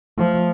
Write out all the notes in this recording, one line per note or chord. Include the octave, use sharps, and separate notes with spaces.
F3 A3